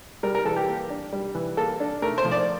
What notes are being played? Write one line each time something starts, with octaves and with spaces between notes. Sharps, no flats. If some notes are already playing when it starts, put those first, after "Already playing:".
G3 A#4
A#4
E3 A4
G4
A#3
D4
G3
E3
A#3 A4
D4
A3 A#4
C5
F3
D5